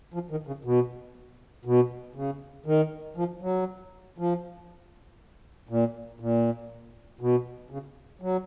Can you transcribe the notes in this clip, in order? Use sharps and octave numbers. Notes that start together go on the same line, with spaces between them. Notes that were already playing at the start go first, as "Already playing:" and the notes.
F3
D#3
C#3
B2
B2
C#3
D#3
F3
F#3
F3
A#2
A#2
B2
C#3
F#3